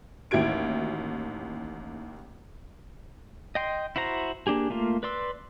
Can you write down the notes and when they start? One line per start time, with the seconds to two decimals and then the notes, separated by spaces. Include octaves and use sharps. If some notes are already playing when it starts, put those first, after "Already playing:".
0.31 A1 D#2 E4 F#4 G#6 D7
3.55 D#5 G5 C6
3.96 E4 F#4 C5 A#5
4.47 A#3 D4 G4 G#4
4.70 A3 A#3 F4
5.03 B4 D5 C6 E6